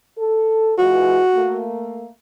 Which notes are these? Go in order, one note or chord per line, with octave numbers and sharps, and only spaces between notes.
A4
E3 G#3 F4 F#4
A3 A#3